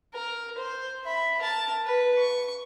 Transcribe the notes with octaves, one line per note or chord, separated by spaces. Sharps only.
A#4
C5
E5 B5
A#4 A5
B4
C#6